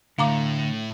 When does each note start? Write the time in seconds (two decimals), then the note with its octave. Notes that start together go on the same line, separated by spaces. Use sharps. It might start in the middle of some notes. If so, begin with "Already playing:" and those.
0.18 A2 D3 F5 A#5 D6